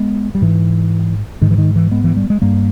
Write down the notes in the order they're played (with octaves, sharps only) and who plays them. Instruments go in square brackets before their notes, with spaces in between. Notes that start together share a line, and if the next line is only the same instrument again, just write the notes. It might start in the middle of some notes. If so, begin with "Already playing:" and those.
Already playing: [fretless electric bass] G#3 B3
G3
G#2 E3
G#2 D#3
E3
D#3
E3
G#3 B3
E3
G3
G#3
G2 G3 A#3